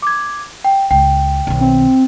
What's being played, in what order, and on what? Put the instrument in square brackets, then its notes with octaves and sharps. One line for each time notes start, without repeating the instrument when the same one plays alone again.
[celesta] D6 G#6
G5
[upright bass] C#2 [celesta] G5
[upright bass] B1 D#3
[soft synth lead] C4